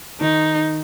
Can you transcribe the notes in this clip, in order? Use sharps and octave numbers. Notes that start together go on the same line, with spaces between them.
D#3 D#4